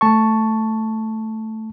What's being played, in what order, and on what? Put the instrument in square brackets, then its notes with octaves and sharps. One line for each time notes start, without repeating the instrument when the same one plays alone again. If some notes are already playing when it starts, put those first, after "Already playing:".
[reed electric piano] A3 A5 C#6